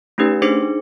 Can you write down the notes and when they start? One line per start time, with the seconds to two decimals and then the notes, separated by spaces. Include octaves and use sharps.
0.18 A3 C#4 D#4 G4 B4
0.42 D4 D#4 G#4 C5 D6 C#7